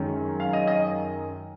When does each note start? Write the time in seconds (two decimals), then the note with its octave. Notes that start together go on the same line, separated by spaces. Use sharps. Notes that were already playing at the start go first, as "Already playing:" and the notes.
Already playing: F#2 D#3 G#3 C#4
0.40 F5
0.53 D#5
0.67 D#5